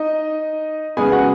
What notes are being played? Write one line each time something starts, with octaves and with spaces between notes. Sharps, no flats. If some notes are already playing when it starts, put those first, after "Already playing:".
Already playing: D#4 D#5
C#3 G#3 B3 G#4 G#5
F#4 F#5